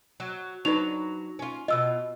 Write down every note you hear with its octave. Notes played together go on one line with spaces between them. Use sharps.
F#3
F#3 D4 D#4 B4 F7
C#4 F4
B2 F4 D#5 E6